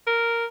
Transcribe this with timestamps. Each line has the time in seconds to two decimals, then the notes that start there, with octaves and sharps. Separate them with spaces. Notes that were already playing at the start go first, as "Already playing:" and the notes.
0.07 A#4